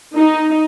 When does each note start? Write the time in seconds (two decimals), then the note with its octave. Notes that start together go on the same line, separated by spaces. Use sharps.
0.15 D#4